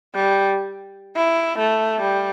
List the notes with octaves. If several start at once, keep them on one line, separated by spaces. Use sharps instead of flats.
G3
E4
A3
G3